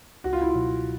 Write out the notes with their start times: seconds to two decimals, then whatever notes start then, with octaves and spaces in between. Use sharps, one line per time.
0.24 C#2 F#4
0.33 F4
0.41 E4
0.49 F4
0.54 B2 F#3